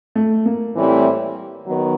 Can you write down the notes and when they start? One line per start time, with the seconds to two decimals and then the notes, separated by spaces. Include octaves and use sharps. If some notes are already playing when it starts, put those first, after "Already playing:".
0.15 A3
0.45 A#3
0.76 A2 E3 G3 C4 E4
1.66 D#3 F#3 B3